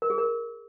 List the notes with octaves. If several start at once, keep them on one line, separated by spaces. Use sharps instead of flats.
A#4
G#4
A#4